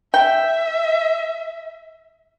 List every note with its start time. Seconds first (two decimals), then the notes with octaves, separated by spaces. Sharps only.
0.14 E5 G5